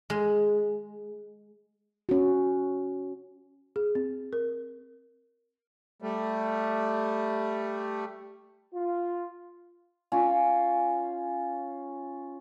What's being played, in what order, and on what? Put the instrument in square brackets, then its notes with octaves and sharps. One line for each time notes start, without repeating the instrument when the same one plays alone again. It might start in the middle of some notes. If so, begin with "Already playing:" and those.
[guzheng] G#3
[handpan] C#4 F#4
[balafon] G#4
C4
A#4
[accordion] G3 A3
[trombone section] F4
[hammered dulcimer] C#4 F4 G#5